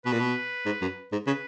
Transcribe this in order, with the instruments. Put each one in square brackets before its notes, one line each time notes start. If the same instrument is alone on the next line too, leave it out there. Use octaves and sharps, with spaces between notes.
[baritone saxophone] B2 [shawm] B4
[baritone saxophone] A#2
B2
G#2
F#2
G#2
[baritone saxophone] C#3 [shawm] B4